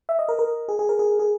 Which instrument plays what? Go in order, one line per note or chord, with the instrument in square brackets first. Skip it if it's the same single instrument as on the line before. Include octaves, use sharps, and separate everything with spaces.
[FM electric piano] E5
D#5
A#4
A#4
G#4
G#4
A#4
G#4
G#4